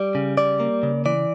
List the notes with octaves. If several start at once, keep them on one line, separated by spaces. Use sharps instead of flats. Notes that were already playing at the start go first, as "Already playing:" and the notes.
Already playing: G3 D5
C#3
G3 D5
A#3
C#3
E3 D5